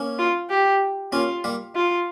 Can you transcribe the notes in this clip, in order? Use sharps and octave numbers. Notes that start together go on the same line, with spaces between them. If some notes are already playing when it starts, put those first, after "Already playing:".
Already playing: A#3 C#4
F4
G4
A#3 C#4 F4
G3 A#3
F4